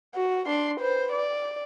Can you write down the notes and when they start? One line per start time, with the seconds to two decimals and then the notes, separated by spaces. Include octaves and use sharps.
0.15 F#4
0.47 D4 C6
0.80 B4 C5
1.12 D5